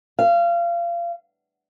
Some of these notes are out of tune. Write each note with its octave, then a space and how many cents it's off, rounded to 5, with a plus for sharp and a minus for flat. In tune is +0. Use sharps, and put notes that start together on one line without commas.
F5 -25